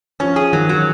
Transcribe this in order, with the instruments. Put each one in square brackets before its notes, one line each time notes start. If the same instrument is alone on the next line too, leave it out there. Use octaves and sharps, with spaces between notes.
[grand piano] F3 [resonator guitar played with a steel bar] C#4
[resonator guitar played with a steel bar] G#4
[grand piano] D#3 [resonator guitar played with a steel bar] F#3
[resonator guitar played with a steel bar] F#3